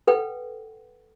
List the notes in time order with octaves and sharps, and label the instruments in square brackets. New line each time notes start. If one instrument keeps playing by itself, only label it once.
[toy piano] A4 B4 F#5 G5